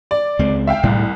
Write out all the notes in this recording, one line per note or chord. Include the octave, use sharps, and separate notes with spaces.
D5
C#2 G#3 C4
E5 F5 G5
C2 A2 G3